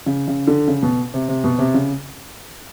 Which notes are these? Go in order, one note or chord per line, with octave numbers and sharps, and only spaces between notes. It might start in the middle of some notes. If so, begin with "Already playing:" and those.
C#3
C#3
D3
C#3
B2
C3
C3
B2
C3
C#3